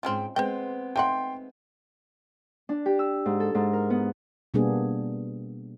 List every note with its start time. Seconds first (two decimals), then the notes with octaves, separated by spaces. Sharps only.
0.03 G#2 C4 C#4 F4 G5
0.36 G#3 B3 C4 C5 D#5 G5
0.96 A3 D#4 F#5 G5 C6
2.69 D4
2.86 G4
2.99 E6
3.26 G#2
3.40 A4
3.55 G#2
3.73 A#4
3.90 B3
4.54 B2 G3 A#3 B3 D4 G#4